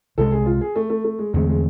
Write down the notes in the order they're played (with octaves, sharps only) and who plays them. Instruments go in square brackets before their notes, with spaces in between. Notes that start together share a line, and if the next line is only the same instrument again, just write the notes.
[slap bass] C2 C3 G#3 [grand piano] A4
[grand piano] G#4
F4
G#4
A3
A3
A3
G#3
[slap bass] E2 D3 A3 C4 [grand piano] G#3
[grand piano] G#3